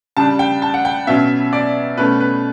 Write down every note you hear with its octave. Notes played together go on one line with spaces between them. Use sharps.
C#3 G3 D4 A5
G5
A5
F#5
G5
B2 F#3 C#4 E5
D5
B2 A3 C#4 B4
B4